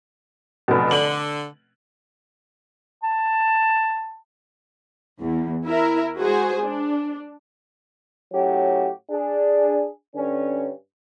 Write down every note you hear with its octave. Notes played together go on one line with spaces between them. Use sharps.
F1 B2
D3 F#7
A5
E2
E4 A#4 E5
G#3 F#4 G#4 C5
D4
A2 F#3 C#4 F#4 G4
D4 G#4
G2 D3 C#4